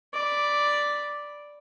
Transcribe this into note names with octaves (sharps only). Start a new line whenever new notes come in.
D5 B5